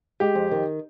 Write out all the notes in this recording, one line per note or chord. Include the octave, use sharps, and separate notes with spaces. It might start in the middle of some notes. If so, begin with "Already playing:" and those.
G#3 G4
F2
D#3